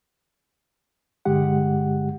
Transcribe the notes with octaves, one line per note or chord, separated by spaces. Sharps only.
G2 D3 G#3 G4 F#5